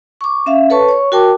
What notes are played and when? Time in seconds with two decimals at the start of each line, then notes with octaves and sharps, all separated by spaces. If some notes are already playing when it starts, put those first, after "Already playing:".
0.21 C#6 D6
0.46 C#4 E5 F5
0.70 A4 B4 C#5 A5 C#6
0.89 C#5 C#6
1.12 F#4 A#4 G5 A5 D6